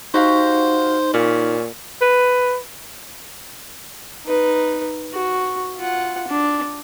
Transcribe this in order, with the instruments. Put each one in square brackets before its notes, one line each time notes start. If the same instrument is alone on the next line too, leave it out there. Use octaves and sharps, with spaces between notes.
[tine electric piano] D#4 [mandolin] F#4 G4 F5 [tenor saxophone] C5
[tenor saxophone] A#2 [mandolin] C#4
[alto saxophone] B4
[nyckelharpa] D#4 B4
F#4
F4 F#5
D4